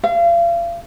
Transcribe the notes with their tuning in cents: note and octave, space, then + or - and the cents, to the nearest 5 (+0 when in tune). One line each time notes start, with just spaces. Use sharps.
F5 -35